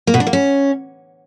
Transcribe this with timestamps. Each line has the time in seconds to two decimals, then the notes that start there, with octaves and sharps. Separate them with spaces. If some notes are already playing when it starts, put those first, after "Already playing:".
0.07 A#3
0.14 B2
0.20 D4
0.27 A#3
0.33 C#4